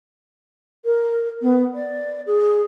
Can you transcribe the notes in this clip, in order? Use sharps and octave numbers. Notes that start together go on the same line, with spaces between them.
A#4
B3
D5
G#4